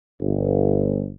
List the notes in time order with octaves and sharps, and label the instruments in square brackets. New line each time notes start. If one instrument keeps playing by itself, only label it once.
[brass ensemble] G1